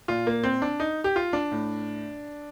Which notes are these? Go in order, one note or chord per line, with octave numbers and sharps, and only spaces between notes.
A#2 F4
A#3
C4
D4
D#4
G4
F4
D4
A2